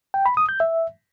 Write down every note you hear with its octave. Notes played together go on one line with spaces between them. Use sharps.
G5
B5
D#6
G6
E5